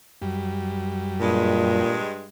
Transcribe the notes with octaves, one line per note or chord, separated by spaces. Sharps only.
F#2 G3
G2 A#2 G#3